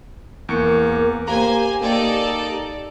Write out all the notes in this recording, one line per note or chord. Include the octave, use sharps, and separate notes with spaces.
E2 A#3 C#6 C#7
A#3 G4 C5 G#5 A#5
A#3 D#4 A4 D5